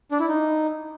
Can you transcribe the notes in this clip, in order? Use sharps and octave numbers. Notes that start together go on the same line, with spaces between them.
D4
E4
D#4